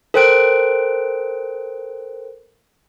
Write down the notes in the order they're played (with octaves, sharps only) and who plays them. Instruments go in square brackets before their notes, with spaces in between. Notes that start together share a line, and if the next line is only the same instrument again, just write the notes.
[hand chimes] A4 A#4 C5 G5 F#6 D7